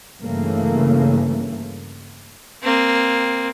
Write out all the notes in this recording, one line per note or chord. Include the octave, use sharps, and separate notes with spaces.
G2 C#3 E3 A3 A#3
A#3 C4